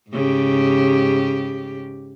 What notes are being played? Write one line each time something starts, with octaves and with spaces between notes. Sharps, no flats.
G#2 C#3 G4